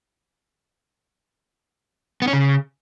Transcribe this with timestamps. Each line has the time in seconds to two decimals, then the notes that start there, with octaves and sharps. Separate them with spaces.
2.22 B3
2.28 C#4
2.33 C#3